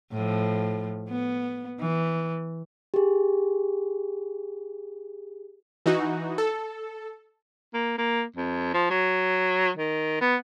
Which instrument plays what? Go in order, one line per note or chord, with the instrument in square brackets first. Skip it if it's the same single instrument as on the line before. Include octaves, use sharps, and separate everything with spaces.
[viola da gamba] A2 F3
B3
E3
[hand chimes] G4 G#4
[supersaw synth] E3 D#4 F#4
A4
[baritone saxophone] A#3
A#3
F2
F3
F#3
D#3
B3